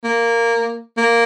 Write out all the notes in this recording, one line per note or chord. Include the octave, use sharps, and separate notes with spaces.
A#3
A#3